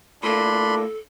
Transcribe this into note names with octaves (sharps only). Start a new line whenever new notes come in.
A2 A#3 D4 A4 B5 C6